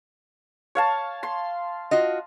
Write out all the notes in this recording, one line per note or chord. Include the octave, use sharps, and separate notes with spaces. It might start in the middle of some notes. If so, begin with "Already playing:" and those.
C#5 F5 A5
C6
F4 F#4 D#5